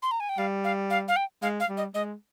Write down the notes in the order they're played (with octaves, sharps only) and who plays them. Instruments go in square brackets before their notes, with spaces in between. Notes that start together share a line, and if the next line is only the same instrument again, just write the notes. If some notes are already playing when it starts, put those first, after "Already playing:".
[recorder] C6
A#5
G#5
G5
[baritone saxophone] G3 [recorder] F5
[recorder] F5
F5
F5
G5
[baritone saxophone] G#3 [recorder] F5
[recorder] F5
[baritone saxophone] G3
[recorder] D#5
[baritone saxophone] G#3 [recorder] D#5